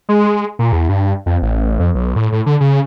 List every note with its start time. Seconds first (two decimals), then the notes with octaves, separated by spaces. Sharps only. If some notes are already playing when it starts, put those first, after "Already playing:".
0.09 G#3
0.59 A#2
0.72 E2
0.89 G2
1.26 F2
1.42 A1
1.80 F2
1.95 B1
2.16 A2
2.32 A2
2.46 D3
2.60 C#3